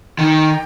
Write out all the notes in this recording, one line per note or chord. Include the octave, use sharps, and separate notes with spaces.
D#3 G5